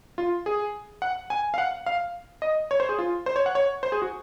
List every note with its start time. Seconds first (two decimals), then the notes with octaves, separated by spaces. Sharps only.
0.18 F4
0.46 G#4
1.02 F#5
1.30 G#5
1.54 F5
1.58 F#5
1.86 F5
2.42 D#5
2.71 C#5
2.80 C5
2.89 G#4
2.99 F4
3.26 C5
3.36 C#5
3.46 F#5
3.55 C#5
3.83 C5
3.92 G#4
4.02 F#4